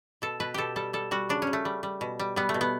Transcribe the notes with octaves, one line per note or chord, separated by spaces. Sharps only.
B2 A4
B2 B4
B2 G4 A4
G3 A4
G3 A4
G3 F#4
C#3 D4
C#4
C#3
A3
G3
G3
B2
G3
G3 B3
A3
B2
B3